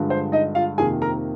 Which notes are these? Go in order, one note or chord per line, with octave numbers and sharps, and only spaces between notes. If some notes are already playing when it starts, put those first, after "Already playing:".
Already playing: G2 D3 F3 G#3
C5
D#4 D#5
F4 F5
F2 C3 D#3 A#3 G#4 G#5
A#4 A#5